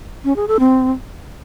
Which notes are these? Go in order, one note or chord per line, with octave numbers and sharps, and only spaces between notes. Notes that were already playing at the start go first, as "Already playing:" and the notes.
C#4
G#4
A4
C4